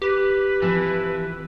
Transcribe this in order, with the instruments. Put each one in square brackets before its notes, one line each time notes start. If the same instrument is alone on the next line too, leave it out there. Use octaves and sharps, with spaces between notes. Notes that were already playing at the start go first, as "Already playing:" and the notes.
[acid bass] G4 [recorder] B4
[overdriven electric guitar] E3 [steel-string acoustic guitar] F3 C4